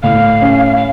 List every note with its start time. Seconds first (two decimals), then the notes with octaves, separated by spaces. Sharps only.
0.03 A2 F5
0.42 C#4
0.76 F5